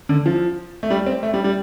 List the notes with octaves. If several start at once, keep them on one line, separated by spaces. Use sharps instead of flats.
D3
F3
A3
G3
C4
A3
G3
G3